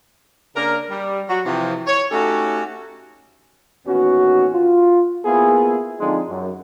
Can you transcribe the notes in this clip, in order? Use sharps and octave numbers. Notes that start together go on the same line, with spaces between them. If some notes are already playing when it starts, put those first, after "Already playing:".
C#3 A#3 D4 A#4
G3
F#3 F#4
C3 E3 F3
C#5
A3 C#4 D#4 F#4 G4 A4
A1 D#2 B3 C#4 F#4
F4
A#3 B3 E4 F4 G#4
D3 F3 G#3 C4 D4 D#4
F#2